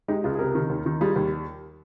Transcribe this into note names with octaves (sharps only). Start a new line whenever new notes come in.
G#3 D#4 G4
C#2 F4 G#4
G#4
C3 G4 A#4
D#3
D#2
D#3
G3 F4 G#4
D#2